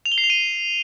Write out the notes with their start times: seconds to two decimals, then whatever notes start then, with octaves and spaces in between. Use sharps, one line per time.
0.06 F7
0.12 G7
0.18 C7
0.24 F7
0.30 D#7